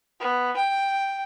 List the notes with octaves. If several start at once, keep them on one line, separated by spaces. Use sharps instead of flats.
B3
G5